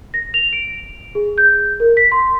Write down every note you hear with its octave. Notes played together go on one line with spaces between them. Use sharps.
A#6
F7
D7
G#4
G6
A#4
B6
C6